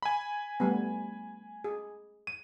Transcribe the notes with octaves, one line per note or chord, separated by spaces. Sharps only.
G#5 B5
G3 A3 B3
G#4
D#7